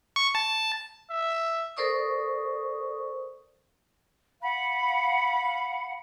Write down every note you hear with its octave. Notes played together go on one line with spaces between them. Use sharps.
C#6
A5
E5
A4 A#4 C5 D5 C#6 D#6
F5 F#5 B5